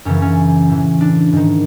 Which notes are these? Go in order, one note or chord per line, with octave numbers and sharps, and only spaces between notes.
F#2 C#3 E3 C#4
C#4
A2 E3
D4
G#2 D#3